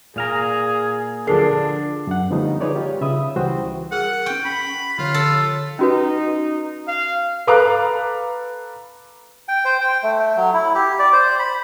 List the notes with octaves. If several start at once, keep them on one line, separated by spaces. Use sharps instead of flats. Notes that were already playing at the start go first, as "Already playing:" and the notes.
A#2 G#4 F5 A#5
D3 F3 D4 G#4 A#4 C7
F#2 F#5
D3 F3 G3 A3 B3 D#4
D#4 G#4 B4 C#5 D5
F4 G4
C#3 E5 B5 D#6
C#2 E3 G3 F#4 C5 G5
G#4 A#4 F#5 F6
C#4 G5 C#6
B5
D3 F3 F4 C#5
A4
C#4 D#4 F#4 B4
F5
A4 B4 F5 A#5 D6 F#6
G5
C5
G5
A3
F#3
E4
G4
D5
C5
B5